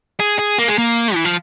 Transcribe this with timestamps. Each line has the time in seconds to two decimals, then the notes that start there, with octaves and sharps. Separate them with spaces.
0.20 G#4
0.39 G#4
0.59 A#3
0.68 G#3
0.78 A#3
1.14 E3
1.25 F3